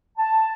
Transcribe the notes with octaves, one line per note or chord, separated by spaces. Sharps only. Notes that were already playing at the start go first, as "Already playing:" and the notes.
A5